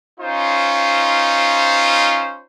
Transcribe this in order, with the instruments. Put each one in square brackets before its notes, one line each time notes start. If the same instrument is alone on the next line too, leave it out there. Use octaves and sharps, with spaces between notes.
[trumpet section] C#4 D#4 F4 C5